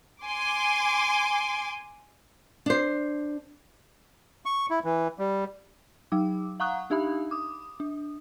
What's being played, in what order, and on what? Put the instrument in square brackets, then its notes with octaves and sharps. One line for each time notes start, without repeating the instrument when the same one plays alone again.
[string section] G#5 C6 D6
[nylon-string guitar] D4 C5
[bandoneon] C#6
E4
E3
G3
[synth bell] F#3 D#4 D6
F5 F#5 A#5 C#6 D#6 F#6
D4 D#4 G4 E5 F5 B5
D6 D#6
D4